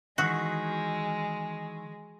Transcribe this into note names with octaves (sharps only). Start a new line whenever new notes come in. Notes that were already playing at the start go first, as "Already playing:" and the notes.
D#3 E3 G#3 F#4